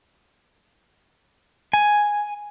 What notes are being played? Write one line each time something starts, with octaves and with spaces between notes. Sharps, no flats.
G#5